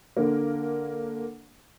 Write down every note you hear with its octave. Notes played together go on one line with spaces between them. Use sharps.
D3 A#3